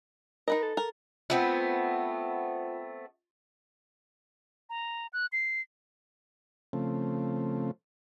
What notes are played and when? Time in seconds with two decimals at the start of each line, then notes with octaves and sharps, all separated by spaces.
0.48 D#4 A#4 B4 D#5
0.63 A4
0.77 A#4
1.30 A3 B3 C4 F4 C5
4.70 A#5
5.13 F#6
5.33 C7
6.73 C#3 F3 A3 C4